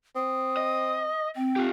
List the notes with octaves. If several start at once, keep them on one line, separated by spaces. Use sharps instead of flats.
C4 D#6
D#5
C4 G5
F4 G4